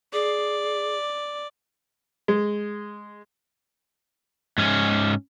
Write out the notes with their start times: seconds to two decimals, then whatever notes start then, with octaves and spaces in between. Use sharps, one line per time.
0.13 G#4 D5
2.28 G#3
4.58 G#2 C#4